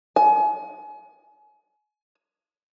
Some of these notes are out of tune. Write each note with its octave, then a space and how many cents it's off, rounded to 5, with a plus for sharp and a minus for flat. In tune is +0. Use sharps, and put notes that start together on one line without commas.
G#5 +35